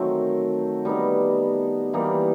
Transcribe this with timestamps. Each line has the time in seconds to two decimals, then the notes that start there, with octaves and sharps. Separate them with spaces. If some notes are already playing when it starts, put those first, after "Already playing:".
Already playing: D#3 F#3 A3 C4
0.85 G3 B3 D#4
1.93 E3 G3 A#3 D#4